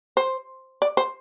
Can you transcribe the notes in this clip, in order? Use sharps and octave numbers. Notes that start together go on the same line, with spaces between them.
C5
D5
C5